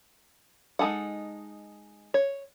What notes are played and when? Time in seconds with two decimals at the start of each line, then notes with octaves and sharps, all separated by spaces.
0.79 G#3 D#4 G#4 A4 F#5
2.14 C#5